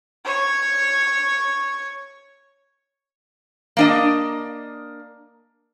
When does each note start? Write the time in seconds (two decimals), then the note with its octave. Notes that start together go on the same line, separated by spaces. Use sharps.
0.25 C#5 C#6
3.77 A#3 D4 D#5